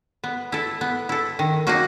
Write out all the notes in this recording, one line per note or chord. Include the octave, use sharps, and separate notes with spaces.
B3
E4 A4
B3
E4 A4
D#3
F#3 A#3 D#4 F#4